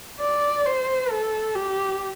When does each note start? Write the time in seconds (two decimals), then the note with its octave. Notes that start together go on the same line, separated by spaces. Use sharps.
0.20 D5
0.66 C5
1.10 A4
1.55 G4